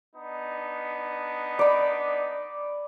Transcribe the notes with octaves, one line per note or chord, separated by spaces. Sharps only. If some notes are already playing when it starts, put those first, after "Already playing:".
B3 D4 D#4
D5 B5